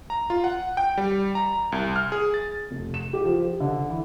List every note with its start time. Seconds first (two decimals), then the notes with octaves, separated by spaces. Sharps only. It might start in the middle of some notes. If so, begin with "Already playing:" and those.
0.10 A#5
0.30 F4
0.44 F#5
0.77 G5
0.98 G3
1.35 A#5
1.72 C2
1.96 F6
2.12 G#4
2.34 A6
2.71 F1
2.94 E7
3.13 G4
3.25 F3
3.44 G4
3.60 D3
3.90 E3